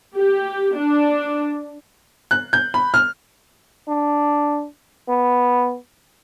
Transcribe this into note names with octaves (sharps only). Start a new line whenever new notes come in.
G4
D4
F#6
G6
B5
F6
D4
B3